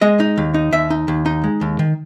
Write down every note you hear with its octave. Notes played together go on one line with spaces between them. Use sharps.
G#3 D#5
D#4
D#2
D#4
D#2 E5
D#4
D#2
D#4
G#3
D#2
D#3